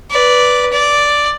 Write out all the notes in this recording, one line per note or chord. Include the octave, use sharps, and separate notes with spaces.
B4 D5
D5